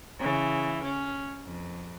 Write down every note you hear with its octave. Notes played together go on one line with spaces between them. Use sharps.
C#3 E3
C#4
F2